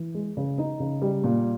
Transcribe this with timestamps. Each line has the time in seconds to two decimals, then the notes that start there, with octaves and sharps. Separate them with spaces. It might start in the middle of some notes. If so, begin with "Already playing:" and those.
Already playing: E3
0.14 G#3
0.37 C#3
0.58 D#4
0.80 C#3
1.02 G3
1.24 A#2